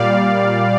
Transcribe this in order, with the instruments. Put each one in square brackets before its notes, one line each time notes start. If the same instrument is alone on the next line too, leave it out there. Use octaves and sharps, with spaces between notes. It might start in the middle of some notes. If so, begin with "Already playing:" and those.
Already playing: [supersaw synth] A#2 G3 D5 F5